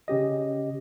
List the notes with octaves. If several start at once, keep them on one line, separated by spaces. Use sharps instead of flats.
C#3 C#4 G4 D#5